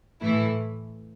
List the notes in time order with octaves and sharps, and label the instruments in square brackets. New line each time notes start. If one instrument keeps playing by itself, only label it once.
[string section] A2 E3 A3 E4